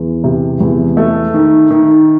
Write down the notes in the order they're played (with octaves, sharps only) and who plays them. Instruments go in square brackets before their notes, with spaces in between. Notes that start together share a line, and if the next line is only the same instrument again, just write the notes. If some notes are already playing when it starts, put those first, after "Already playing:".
Already playing: [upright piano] E2
C3
E2
A3
D#3
D#3